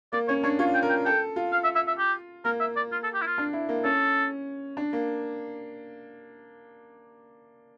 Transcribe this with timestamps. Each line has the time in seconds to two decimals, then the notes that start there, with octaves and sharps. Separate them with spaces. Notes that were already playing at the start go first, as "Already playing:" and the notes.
0.13 A#3 D5
0.28 C#4 C#5
0.44 D4 C#5
0.59 F4 C#5
0.74 G5
0.83 A#4
0.90 G5
1.05 A4 G5
1.36 F4
1.52 F5
1.64 E5
1.75 E5
1.87 E5
1.98 G4
2.45 A#3 A#4
2.60 E5
2.76 D5
2.92 F4
3.04 A4
3.14 G4
3.22 E4
3.26 F4
3.38 D4
3.53 E4
3.69 A#3
3.84 C#4 A4
4.77 D4
4.93 A#3